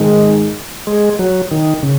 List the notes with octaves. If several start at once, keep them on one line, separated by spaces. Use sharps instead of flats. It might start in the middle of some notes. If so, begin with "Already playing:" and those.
Already playing: G#2 D#3 G#3
G#3
F#3
D#3
C#3